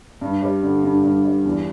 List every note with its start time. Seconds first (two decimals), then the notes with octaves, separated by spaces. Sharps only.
0.21 G2
0.42 G3
0.63 D3
0.84 G2
1.04 G2
1.24 G3
1.45 E2